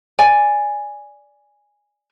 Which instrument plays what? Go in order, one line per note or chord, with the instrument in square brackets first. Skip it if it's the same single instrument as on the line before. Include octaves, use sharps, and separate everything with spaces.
[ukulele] D5 G#5